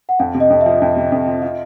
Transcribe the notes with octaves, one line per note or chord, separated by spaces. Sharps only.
F#5
F2 F5
C3
D#5
F2
F3 E5
F2
C3
F2
F3
F4